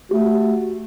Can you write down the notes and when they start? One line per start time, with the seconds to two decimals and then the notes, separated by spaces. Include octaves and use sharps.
0.11 A3 F#4 G4